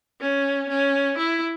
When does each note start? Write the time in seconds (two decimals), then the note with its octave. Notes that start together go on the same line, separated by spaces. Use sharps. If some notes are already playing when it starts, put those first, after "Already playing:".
0.21 C#4
0.70 C#4
1.18 E4